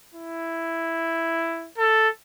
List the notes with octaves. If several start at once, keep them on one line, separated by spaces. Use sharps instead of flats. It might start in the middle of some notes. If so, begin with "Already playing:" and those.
E4
A4